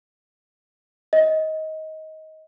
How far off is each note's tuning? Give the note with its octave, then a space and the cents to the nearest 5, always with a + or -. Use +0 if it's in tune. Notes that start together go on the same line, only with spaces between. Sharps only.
D#5 +20